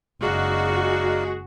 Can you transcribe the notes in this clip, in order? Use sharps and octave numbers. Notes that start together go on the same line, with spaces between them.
F#1 G#3 D#4 F#4 G#4 D5 F5